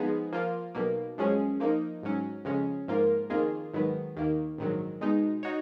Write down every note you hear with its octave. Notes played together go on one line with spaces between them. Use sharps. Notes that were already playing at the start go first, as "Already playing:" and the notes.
Already playing: F3 G#3 B3 D#4 G#4
F3 A#3 F4
B1 B2 A#3
F#2 F3 G#3 C#4 G#4
F3 A#3 D#4
G#2 F#3 C#4
F2 C#3 G#3 C#4
G#2 F3 A#3 F4 A#4
F2 D#3 A#3 F4 G#4
G#1 G#2 D#3 F#3 B3
D#2 D#3 A#3
A#1 G#2 D#3 F#3
B2 G#3 D#4
D#4 F#4 C#5